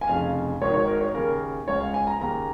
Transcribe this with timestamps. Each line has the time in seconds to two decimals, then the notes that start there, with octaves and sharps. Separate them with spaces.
0.01 G#5
0.07 F1 F2 C#3 F5
0.61 G#1 G#2 D#3 C#5
0.74 C#5
0.87 A#4
1.01 C#5
1.14 D#2 C#3 A#4
1.68 C#2 C#3 C#5
1.80 F5
1.94 G#5
2.07 A#5
2.20 D#2 C#3 A#5